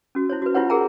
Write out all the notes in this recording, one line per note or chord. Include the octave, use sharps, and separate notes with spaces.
C#4 F#4
E4 C5 C#5
F#4 B4
E4 F4 G4 B4 C#5 F#5
G#4 A#4 F#5 G5 A#5